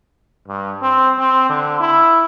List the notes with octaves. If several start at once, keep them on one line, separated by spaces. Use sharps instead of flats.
G2
C4
C4
D3
E4